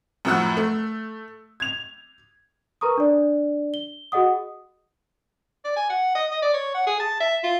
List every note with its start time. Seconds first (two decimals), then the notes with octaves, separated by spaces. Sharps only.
0.25 F#2 A2 F3 F#5 E6 F#6
0.57 A3
1.60 G#6 F7
2.81 A#4 B4 A#5 C#6 D#6
2.98 D4 D5
3.74 G7
4.12 F#4 G#4 D#5 F#5 D#6
5.65 D5
5.76 G#5
5.90 F#5
6.15 D#5
6.31 D#5
6.42 D5
6.54 C#5
6.74 F#5
6.87 G#4
7.00 A5
7.20 E5
7.44 F4